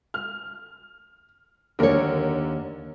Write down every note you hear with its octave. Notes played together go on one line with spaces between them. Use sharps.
F6
D#2 D3 A#3 A#4 C#5